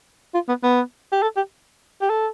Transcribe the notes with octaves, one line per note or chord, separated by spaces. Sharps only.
F4
B3
B3
G4
A4
G4
G4
A4